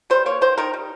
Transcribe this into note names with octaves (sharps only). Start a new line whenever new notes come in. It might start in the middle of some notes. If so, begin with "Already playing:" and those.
G3 C5
A#3 C#5
D#3 C5
D#3 A#4
G3